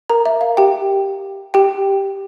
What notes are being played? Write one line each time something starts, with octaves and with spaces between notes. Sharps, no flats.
A#4 A#5
E5
F5
G4 G5
G4 G5